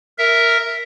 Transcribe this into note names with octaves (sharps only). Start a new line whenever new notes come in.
A#4 E5